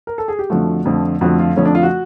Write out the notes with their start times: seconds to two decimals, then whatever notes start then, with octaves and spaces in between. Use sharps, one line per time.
0.07 A#4
0.18 A4
0.28 G#4
0.39 G4
0.50 F2 D3 F3 A3 F#4
0.85 F2 D3 F3 A3
1.21 F2 D3 F3 A3 F#4
1.39 F4
1.56 F2 D3 F3 A3 C#4
1.65 D4
1.75 F4
1.83 F#4